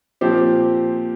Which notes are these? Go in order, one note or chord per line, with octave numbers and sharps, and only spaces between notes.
A#2 F3 C4 G4 C5